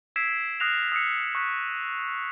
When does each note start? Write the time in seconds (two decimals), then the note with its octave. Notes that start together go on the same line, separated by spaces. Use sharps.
0.16 E6 G#6 B6 C7 D7 E7
0.60 D#6 F6 F#6 A#6 C7 F7
0.92 D#6 E6 C7 C#7
1.35 C#6 D#6 F#6 B6